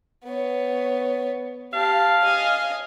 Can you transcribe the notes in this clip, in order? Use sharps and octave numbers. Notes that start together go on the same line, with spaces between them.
B3 C#5
G4 F5 A5
D#5 G#5